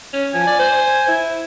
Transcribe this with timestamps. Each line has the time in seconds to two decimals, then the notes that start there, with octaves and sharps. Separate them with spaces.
0.13 C#4
0.34 F3 G#5
0.47 D5
0.59 C5
1.08 E4